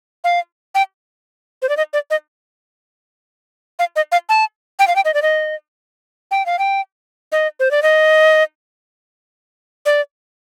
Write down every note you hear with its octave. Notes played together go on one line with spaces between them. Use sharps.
F5
G5
C5
D5
D#5
D5
D#5
F5
D#5
F5
A5
G5
F5
G5
D#5
D5
D#5
G5
F5
G5
D#5
C5
D5
D#5
D5